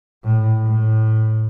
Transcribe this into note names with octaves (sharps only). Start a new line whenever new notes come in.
A2
A2